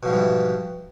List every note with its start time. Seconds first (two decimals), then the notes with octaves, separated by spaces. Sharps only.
0.03 B2
0.05 F3
0.08 G#2
0.10 G3
0.13 E3